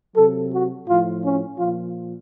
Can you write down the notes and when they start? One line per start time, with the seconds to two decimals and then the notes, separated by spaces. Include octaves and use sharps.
0.15 C3 F#3 A4
0.51 F#4
0.87 A2 F3 F4
1.23 C#4
1.58 A#2 F3 F4